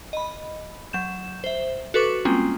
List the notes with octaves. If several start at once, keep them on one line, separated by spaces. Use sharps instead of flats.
D#5 B5
F#3 G6 E7
C5 E5
F#4 A4 B4 C#6 D6
G3 G#3 A#3 C4 C#4 F4